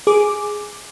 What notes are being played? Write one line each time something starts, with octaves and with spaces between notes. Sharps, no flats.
G#4 D6